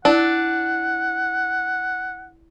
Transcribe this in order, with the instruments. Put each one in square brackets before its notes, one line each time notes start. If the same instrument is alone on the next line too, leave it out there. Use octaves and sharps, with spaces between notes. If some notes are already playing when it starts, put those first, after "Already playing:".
[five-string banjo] D4 [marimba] E4 [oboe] F#5